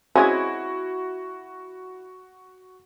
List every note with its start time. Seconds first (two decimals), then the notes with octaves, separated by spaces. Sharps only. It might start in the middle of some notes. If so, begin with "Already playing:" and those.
0.16 G#3 C4 C#4 E4 F#4 G#5 D#6